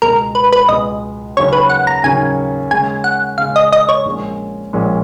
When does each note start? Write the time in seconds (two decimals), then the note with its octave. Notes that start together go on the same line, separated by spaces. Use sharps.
0.02 C#2 B2 G#3 A#4
0.35 B4
0.53 B4
0.69 C#2 B2 G#3 D#5
1.37 D#2 C#3 F#3 C#4 C#5
1.53 B4
1.69 F#5
1.87 A#5
2.03 D#2 C#3 F#3 C#4 G#5
2.71 C#3 G#3 C#4 G#5
3.04 F#5
3.38 C#3 G#3 C#4 F5
3.56 D#5
3.72 D#5
3.89 C#5
4.05 A#1 A#2 F3 G#3 C#4
4.73 A#1 A#2 F3 G#3 C#4